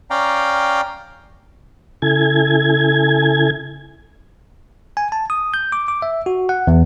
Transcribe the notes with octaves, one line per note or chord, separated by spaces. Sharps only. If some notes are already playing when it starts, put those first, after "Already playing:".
C#4 D5 F5 G5 A#5
C#3 E4 A4 G#5 G#6
G#5
A5
D#6
G6
D6
D6
E5
F#4
F#5
E2